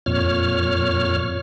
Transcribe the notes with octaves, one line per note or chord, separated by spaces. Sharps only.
F2 A#2 C#5 F6